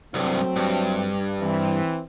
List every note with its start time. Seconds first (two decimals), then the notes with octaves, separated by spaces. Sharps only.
0.14 C2 G2 F#3 A3 C4
0.56 G2
1.40 E3 C4